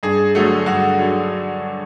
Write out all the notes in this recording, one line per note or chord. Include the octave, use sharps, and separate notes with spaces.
G2 G#4
D3 F#3 A3
G2 F#4
D3 F#3